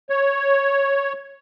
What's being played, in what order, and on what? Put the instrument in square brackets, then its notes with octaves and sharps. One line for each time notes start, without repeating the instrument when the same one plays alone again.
[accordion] C#5